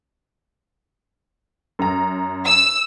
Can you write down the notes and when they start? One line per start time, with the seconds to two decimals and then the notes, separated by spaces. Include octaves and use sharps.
1.79 F#2 A#5
2.45 E6